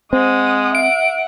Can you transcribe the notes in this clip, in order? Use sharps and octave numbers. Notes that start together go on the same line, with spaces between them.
G#3 C4 F#5 D#6
E5 F#5 D7